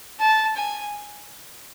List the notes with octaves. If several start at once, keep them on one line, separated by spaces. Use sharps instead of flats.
A5
G#5